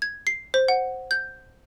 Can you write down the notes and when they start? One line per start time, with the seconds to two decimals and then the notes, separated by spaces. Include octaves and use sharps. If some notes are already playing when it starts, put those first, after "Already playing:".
0.02 G#6
0.27 C7
0.54 C5
0.68 F#5
1.11 G6